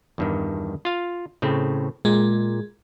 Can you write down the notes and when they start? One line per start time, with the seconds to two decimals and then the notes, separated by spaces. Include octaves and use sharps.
0.18 E2 G2 D#3
0.85 F4 F5
1.42 A2 C#3 C4
2.05 A#2 G#3